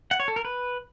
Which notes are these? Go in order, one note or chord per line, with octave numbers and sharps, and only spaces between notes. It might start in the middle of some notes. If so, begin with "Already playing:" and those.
F#5
C#5
A4
A#4
B4